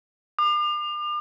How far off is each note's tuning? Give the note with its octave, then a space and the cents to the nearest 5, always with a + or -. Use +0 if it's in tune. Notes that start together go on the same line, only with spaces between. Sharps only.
D6 +40